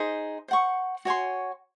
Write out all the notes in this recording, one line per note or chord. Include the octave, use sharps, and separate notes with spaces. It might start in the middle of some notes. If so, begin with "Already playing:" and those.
Already playing: D#4 G#4 C5
C5 F#5 C#6
F#4 C#5 G#5 C6